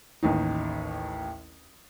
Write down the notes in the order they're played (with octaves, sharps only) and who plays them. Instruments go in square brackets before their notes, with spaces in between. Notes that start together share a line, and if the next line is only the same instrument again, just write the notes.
[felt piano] A1 D#2 D#4